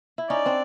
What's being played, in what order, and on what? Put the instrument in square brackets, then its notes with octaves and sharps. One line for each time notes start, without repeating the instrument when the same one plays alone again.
[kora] E4
[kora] C#4 D#4 [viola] D5
[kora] C4 D4